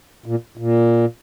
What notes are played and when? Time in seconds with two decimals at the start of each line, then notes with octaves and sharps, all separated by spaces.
0.26 A#2
0.58 A#2